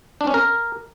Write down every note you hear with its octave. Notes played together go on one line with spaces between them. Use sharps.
D4
C#4
A#4